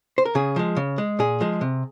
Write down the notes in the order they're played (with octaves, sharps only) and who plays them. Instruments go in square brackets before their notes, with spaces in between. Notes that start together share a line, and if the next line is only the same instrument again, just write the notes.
[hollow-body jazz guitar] C5
A#4
C#3 G#4
F3 G#3
C#3
G#3
A#2 G#4
F3 G#3
C3